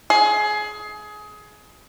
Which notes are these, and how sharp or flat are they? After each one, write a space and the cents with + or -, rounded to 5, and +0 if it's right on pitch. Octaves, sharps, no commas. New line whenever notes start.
G#4 +20